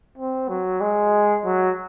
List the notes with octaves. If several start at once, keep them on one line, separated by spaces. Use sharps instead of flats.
C4
F#3
G#3
F#3